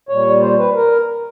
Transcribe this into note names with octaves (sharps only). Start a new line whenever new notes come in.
A#2 G3 C#5
C5
B4
A#4